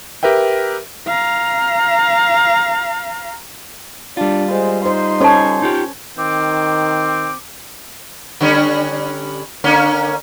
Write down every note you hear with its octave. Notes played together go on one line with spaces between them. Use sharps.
G4 A#4 B4 E5 G5
F5 A#5
G3 D4 F4
G#3 C5
D#4 C5 C6
C#4 A4 C5 C#5 A5
D#4 F4 G4
D#3 C4 D6
D3 G3 C#4
D3 A#3 C#4